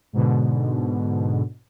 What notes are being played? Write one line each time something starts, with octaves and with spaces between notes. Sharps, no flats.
G#2 B2 D3